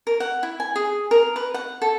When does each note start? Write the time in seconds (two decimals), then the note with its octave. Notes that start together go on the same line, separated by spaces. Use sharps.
0.07 A#4
0.20 F#5
0.43 E4
0.60 G#5
0.76 G#4
1.11 A#4
1.36 B4
1.54 F#5
1.82 A4